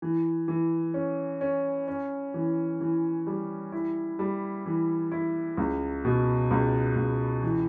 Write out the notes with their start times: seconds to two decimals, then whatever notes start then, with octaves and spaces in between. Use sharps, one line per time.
0.02 E3
0.48 E3
0.94 C#4
1.41 C#4
1.88 C#4
2.34 E3
2.80 E3
3.27 G3
3.72 E4
4.19 G3
4.66 E3
5.12 E4
5.57 C#2
6.05 B2
6.51 C#2
6.96 C#2
7.42 E3